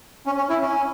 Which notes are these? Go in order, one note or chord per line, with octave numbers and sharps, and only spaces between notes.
C#4
C#4
E4
C#4